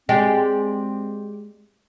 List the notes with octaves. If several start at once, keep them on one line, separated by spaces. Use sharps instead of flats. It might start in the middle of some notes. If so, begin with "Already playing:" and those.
G#3 C4 G4 D5 G5